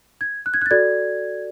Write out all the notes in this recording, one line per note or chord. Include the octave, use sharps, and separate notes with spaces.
G#6
F#6
G#6
F#6
A6
F#4 A4 D5 G#6